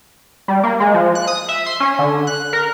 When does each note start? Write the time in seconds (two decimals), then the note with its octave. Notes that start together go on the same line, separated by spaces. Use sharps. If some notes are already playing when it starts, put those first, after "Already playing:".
0.48 G3
0.63 A#3
0.80 G#3
0.94 F3
1.15 F#6
1.27 D#6
1.49 E5
1.66 C6
1.80 C#4
1.99 D3
2.27 F#6
2.53 A#4